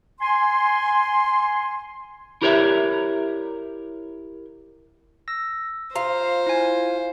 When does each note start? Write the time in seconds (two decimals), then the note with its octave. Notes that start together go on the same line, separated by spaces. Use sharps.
0.20 G#5 C6
2.42 E4 G4 A#4 C#5 D5 E5
5.28 E6 A#6
5.96 F4 C5 A#5
6.46 E4 G#5